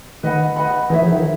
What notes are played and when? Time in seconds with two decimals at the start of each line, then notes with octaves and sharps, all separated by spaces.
0.23 D#3 B4 D#5 F#5 B5
0.56 B4 D#5 F#5 B5
0.90 E3 D#4 G#4 C#5 E5
1.02 F3
1.12 D#3